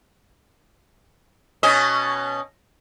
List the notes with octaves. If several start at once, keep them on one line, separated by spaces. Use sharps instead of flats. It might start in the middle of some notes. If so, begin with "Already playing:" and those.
B2 C#4 D#5